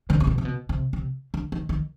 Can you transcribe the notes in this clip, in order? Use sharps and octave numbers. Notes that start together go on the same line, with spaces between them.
D3
C3
B2
C3
B2
C3
C3
D3
D#3
D#3